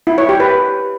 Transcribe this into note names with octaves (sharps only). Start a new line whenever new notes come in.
E4
C#5
G4
B4